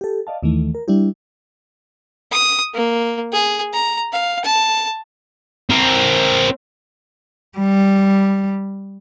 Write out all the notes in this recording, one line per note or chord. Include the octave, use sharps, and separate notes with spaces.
G4 A4
D5 D#5 F5 A5
D#2 D#3 E3 A3
A#4
G3 D4 E4 G4
D#6
A#3
G#4
A#5
F5
A5
C4 A#4
G3